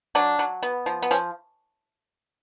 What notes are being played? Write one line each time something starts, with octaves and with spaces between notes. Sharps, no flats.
F#3 D4
F#3
B3
F3
B3
F3 C#4